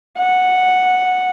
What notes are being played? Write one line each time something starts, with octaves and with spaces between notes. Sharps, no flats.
F#5